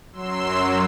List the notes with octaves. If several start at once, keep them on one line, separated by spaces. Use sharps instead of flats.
F#2 F#3 C6 E6